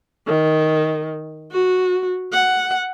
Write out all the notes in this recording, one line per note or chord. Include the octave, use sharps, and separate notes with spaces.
D#3
F#4
F#5